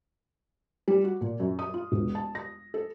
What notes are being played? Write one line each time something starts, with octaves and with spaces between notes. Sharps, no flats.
G3
F#4
A#2
F#2
D#6
F4
E1
A5
A#6
A4